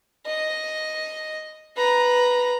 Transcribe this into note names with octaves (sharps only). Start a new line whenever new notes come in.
D#5
B4 A#5